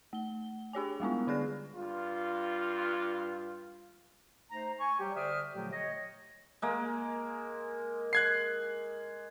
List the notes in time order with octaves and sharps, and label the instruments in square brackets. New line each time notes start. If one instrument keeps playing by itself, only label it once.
[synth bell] A3 G7
D4 G4 C#5 G#5
G3 G#3 B3 E4
D3 D4 G#4 F#6 A#6
[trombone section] G2 F4
[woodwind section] A3 D#4 C5 A#5
G#5 C#6
F#3 G3 G4
D3 C5 D5 E5 D#6 F6
A#2 D3 F3 F#3 A3 G4
C#5 D#5
[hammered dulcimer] G#3 A#3
[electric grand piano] F#6 G#6 C7